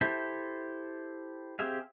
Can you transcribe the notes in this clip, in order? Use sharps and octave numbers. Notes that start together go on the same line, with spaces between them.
E4 G4 A4 C5 E5
C4 G4 G#4 E5 F5